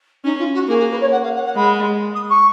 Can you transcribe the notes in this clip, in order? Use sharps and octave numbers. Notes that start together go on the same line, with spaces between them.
C#4 D#4
F4
F#4
A#3 G#4
G#4
B4
C#5
F#5
F5
F#5
F#5
G#3 B5
D#6
C#6